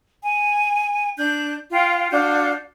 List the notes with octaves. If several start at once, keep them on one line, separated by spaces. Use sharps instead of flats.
G#5
D4 F#6 G6
F4 F5 G5
D4 F#4 F5 G6